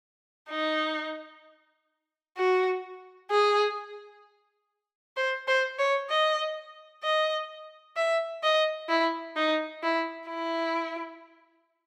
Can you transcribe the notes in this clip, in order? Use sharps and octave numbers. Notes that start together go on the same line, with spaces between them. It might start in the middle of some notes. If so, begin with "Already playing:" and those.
D#4
F#4
G#4
C5
C5
C#5
D#5
D#5
E5
D#5
E4
D#4
E4
E4